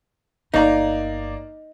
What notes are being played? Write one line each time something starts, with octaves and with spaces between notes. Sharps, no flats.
G1 A#3 D#4 F4 D5 A#5